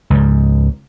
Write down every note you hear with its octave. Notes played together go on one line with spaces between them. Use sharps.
C#2 G#2